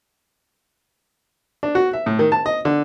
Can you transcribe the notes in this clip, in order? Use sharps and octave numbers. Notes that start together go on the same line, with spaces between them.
D4
F#4
E5
A2
D#3
A5
D#5
D3